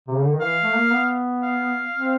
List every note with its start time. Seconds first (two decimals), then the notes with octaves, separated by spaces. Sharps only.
0.08 C3
0.16 C#3
0.24 D3
0.32 D#3
0.40 E3 F5
0.63 A3
0.74 A#3
0.91 B3
1.43 F5
1.95 C4